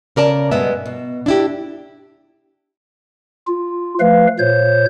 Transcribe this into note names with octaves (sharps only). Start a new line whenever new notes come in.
C#3 A#4 D5 A5
G2 B2 G#3 B3 E5
B2
D4 E4 G4
F4
F3 A3 B4 F5
A#2 C5 C#5 G6